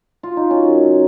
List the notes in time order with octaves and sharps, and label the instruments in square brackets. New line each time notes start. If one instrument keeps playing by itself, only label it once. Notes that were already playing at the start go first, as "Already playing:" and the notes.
[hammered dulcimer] F4
D#4
F#3 C#4
F#2
C#3